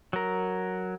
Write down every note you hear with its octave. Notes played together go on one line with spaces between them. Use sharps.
F#3 A#4